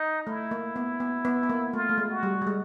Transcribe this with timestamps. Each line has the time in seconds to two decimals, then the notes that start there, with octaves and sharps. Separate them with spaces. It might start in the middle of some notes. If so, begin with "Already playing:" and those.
Already playing: D#4
0.26 A3 E4
0.51 A#3
0.76 B3
1.00 B3
1.25 B3
1.43 B3
1.50 A#3
1.73 A3 F4
1.89 A3
1.98 G#3
2.11 F#4
2.23 G3
2.42 G3
2.47 G#3